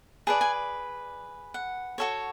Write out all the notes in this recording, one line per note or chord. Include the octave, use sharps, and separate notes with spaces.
G#4 B4 D5 A5
G#5
F#5
F#4 A4 C#5